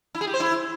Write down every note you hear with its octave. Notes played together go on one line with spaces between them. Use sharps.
E4
G#4
G4
C5
E4